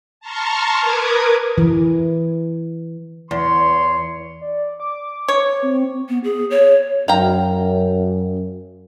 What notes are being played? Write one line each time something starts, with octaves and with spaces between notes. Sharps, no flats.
A5 A#5 C6 C#6 F6
A#4 B4 D6 D#6 G#6
E3
E2 C#5 C6
D5
D6
C#5
C4
B3
G#4
C#5
F#2 F5 G5 A#5